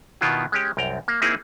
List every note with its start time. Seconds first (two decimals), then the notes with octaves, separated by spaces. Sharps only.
0.21 B2 D#3 B3 E4 F4
0.52 G#3 C#4 G4
0.77 C2 F#2 G5 A#5
1.08 A#3
1.22 A#3 C4 D#4 E4 G#4